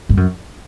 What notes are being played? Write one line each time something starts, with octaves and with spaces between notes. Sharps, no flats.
G2
F#2